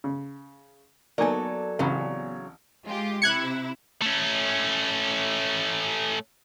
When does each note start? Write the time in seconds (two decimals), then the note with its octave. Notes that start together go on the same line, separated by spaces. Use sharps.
0.04 C#3
1.18 F#3 A#3 B3 D#4 A4 D5 G#5
1.79 A1 C#3 F#3 C4 B5
2.85 G#3 F4 G4
3.22 C3 E4 F#6 G#6 C#7
4.02 A3 C#4